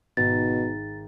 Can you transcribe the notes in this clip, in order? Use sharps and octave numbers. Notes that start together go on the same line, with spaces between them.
G#1 G#2 B2 A#5 A6